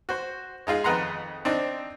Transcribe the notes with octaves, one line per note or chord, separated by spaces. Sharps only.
F#4 C5
G#3 D#4 F4 G#4
F2 D#3 B4 F#5 A#5 C6
C4 D4 D#4